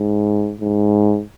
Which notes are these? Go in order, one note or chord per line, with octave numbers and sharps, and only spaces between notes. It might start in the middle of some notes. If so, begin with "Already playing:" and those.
Already playing: G#2
G#2